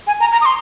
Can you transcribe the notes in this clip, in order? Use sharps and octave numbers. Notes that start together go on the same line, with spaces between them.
G#5
A#5
A#5
D#6
C6